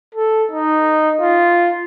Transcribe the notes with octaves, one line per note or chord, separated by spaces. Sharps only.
A4
D#4
F4